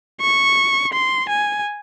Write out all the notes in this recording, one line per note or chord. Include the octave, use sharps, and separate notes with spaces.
C#6
C6
G#5